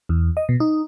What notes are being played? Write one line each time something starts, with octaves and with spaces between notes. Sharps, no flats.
E2
D#5
B2
D#4